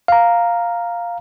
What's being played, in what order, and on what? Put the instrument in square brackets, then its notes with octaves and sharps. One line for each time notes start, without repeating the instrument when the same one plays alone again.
[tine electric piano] F5 A#5